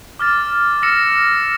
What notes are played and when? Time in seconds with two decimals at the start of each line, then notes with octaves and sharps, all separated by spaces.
0.19 D6 F6 A6
0.83 E6 A#6 C#7 E7